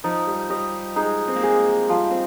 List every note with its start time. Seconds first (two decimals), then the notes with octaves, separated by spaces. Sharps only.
0.04 F3 D#4
0.27 G3
0.50 G3 D#5
0.96 G#3 D#4
1.28 C4
1.36 A#3
1.42 G#3 G#4
1.89 F3 G3
2.11 C4